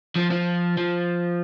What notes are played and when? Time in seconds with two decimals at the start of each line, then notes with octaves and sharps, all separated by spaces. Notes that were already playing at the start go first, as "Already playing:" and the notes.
0.15 F3
0.31 F3
0.78 F3